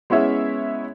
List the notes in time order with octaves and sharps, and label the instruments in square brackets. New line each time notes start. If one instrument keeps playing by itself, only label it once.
[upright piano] G#3 B3 C#4 E4 C#5 E5